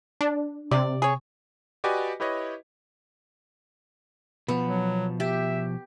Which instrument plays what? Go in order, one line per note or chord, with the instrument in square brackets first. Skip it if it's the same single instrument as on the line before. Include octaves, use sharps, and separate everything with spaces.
[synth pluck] D4
[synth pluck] C3 [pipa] D5
[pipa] G#4 C#5
[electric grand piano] F#4 G4 B4 D5 D#5 G#5
E4 G4 B4 C#5 D#5
[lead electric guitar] B2 F3 [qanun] B3
[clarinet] F#3
[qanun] G4 [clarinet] E5